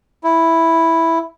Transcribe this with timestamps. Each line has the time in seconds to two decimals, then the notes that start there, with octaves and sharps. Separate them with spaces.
0.24 E4